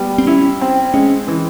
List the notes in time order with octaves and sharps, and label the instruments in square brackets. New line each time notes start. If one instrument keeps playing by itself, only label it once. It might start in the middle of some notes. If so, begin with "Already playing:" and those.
Already playing: [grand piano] G3 B3
[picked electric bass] C4
[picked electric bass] C#4 [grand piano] E4
[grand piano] C4
[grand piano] G#3 [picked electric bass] C#4
[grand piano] E3